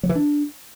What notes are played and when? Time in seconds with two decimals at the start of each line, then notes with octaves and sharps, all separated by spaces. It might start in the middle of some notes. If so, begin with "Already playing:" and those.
0.03 F#3
0.09 E3
0.15 D4